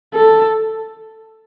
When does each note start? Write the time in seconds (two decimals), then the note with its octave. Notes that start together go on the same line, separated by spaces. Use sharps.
0.15 A4